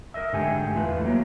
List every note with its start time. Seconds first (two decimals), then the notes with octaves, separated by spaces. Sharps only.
0.14 A#4 C5 D#5 E5
0.33 G#2 D3 A3 G4 G#5
0.75 E2 A3 F4 B4
1.04 F#3 A#3 C#5